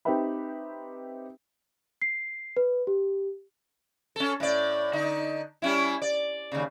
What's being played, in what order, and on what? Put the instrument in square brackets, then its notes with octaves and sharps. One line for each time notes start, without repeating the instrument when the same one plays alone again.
[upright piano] C4 D#4 G4 B4 E5 B5
[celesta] C7
B4
G4
[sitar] C#4 A4
A2 D5
D3 D#4
G3 C#4 E4
D5
D#2 C#3